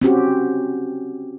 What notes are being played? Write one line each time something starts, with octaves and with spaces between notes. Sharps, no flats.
C4 C#4 F#4 G4